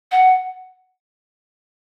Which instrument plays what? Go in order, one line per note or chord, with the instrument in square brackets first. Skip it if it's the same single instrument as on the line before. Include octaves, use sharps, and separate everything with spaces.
[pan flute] F#5